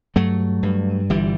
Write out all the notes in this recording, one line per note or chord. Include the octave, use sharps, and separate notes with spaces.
G2 F#3 A3
G2
G1 E3 G3